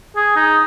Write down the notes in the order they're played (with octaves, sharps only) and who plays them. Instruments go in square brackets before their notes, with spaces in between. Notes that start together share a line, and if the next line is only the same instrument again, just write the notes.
[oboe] G#4
D#4